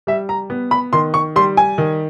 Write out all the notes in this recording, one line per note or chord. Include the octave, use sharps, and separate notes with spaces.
G3 E5
A#5
B3
B5
D#3 C6
C#6
G3 C6
G#5
D#3